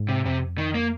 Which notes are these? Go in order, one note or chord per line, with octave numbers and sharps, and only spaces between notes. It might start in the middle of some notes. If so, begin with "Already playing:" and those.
Already playing: G#2
C3
F2 C3
D#3
A#3